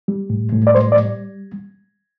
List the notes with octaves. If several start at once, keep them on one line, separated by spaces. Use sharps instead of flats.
G3
A2
A2
D5
G3 C5
D5
G3